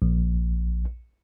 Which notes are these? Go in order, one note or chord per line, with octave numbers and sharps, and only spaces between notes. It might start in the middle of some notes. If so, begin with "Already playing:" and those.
A#1